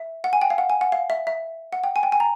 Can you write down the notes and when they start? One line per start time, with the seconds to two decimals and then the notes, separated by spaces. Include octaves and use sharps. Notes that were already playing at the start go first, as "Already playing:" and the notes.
Already playing: E5
0.24 F#5
0.33 G#5
0.42 G5
0.50 F5
0.58 F#5
0.70 G#5
0.81 F#5
0.92 F5
1.10 E5
1.27 E5
1.73 F#5
1.84 G5
1.96 G#5
2.03 G5
2.12 G#5
2.20 A#5